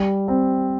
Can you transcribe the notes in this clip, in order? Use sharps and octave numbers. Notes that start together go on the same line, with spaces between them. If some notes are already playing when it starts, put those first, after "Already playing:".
Already playing: G3
C4